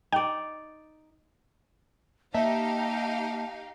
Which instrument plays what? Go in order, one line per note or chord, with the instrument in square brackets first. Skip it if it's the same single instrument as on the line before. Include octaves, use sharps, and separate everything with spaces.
[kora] D#4 D5 [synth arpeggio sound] G5
[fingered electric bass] A#3 [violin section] D#4 G4 F5 [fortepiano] E5 [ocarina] A5